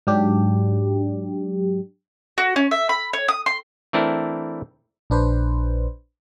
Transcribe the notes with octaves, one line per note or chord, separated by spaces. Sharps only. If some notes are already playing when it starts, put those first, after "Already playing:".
G#2 F#3 D4 G4
F#4
C#4
E5
B5
C#5
D#6
C6
E3 A3 C4 D4 E4 A#4
A#1 D4 B4 C5